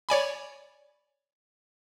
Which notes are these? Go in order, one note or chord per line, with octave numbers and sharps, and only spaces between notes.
C#5 D5 G#5 B5